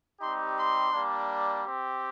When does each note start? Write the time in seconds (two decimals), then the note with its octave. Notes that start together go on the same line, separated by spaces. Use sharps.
0.21 G3 C4 D#4 G4 C6
0.58 C6
0.93 G3 A#3 D4
1.66 C4 G4